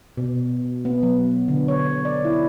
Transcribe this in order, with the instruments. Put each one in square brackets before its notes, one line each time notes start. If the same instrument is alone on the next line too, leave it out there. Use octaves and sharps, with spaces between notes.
[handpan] B2
B3
F#3
D3
C#5
D5
E4